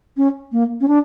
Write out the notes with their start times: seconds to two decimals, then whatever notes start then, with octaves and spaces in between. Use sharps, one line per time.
0.17 C#4
0.52 A#3
0.81 C#4
0.88 D4